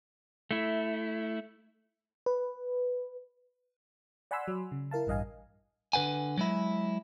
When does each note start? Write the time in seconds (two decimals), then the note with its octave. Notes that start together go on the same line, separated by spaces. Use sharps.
0.51 A3 E4
2.26 B4
4.31 D5 F#5 G#5 B5 C6 E6
4.48 F#3
4.72 C#3
4.91 E4 A#4 F5 A5
5.07 A1 G2 D#5 F5 G#5
5.93 D3 B4 F#5 G#5
6.37 F#3 G#3 E4